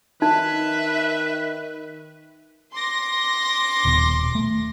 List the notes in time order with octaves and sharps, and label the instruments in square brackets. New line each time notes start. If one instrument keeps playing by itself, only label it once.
[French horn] D#3 [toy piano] D#4 [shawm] B4 [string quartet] E5
[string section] C6 D6 A#6
[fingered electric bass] D#1 D#2 B2
A3